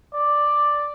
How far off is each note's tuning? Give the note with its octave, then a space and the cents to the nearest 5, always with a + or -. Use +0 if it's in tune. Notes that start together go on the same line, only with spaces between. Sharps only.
D5 +5